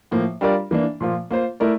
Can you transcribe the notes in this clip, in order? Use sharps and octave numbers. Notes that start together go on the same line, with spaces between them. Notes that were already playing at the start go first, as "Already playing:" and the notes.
A2 F3 A#3
G3 D4 F4 A#4 D5
E3 A#3 D4
A#2 F3 A#3 F4
A#3 F4 C5
A3 E4 A#4 D5